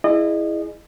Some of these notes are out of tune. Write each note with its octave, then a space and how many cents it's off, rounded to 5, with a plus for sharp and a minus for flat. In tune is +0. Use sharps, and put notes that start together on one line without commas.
E4 +0 G#4 +0 D#5 -35